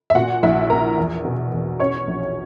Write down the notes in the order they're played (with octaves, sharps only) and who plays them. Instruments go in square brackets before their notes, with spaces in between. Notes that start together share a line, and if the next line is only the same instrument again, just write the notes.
[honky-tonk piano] E5
A#2 F#4 F#5
A#1 E4 E5
A#3 A#4 A#5
E2
B2
E2
C#4 C#5 C#6
A#1